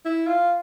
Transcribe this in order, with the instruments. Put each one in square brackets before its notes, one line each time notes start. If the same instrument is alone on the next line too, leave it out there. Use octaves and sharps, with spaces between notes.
[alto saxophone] E4
F4